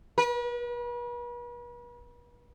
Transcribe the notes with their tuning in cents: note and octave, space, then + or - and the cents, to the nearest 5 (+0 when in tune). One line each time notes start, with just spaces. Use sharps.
B4 -40